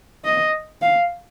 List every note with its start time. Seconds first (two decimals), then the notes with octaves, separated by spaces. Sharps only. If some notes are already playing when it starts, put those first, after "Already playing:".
0.25 D#5
0.82 F5